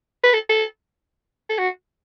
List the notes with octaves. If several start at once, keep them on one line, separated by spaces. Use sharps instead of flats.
B4
A4
A4
A4
F#4